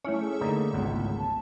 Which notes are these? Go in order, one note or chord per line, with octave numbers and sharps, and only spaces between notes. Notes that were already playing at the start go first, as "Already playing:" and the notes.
A3 C#4 E4 C#5
G#4
D3 A#3 D#4
G#1 C#2 B3
A5